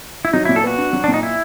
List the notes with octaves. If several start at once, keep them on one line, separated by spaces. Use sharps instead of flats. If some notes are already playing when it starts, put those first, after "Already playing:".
E4
F#3 D#4
A#2 E4
A4
B3 F#4
D4
F#3
A#2 D4
D#4
E4